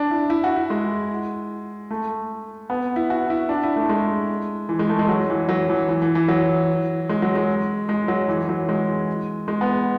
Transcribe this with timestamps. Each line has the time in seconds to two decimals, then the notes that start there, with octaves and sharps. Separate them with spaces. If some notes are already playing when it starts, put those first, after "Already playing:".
Already playing: D4
0.11 E4
0.30 E4
0.44 F#4
0.56 E4
0.70 G#3
1.91 A3
2.70 B3
2.96 E4
3.10 F#4
3.30 E4
3.49 D4
3.63 E4
3.76 A3
3.89 G#3
4.69 E3
4.79 G#3
4.89 A3
4.99 G#3
5.09 F#3
5.30 E3
5.49 F#3
5.70 E3
5.88 E3
6.02 E3
6.15 E3
6.28 F#3
7.09 G#3
7.22 F#3
7.35 G#3
7.89 G#3
8.08 F#3
8.28 E3
8.49 F#3
8.69 G#3
9.48 G#3
9.61 B3